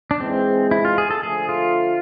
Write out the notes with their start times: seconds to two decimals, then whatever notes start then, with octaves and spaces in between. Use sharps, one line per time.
0.11 D4
0.20 G#2 E3 G#3 C4
0.71 E4
0.85 F4
0.98 G#4
1.11 A4
1.23 D3 F3 A3 G#4
1.49 F4